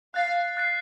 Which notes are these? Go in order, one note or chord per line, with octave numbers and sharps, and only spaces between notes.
F5 F#6 A6 C7
F#6 A6 C7